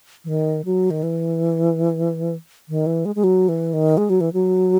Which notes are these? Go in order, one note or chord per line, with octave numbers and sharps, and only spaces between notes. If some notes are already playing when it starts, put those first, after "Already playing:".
E3
D#3
F#3
D#3
E3
D#3
E3
G#3
G#3
F#3
E3
D#3
G#3
F#3
E3
F#3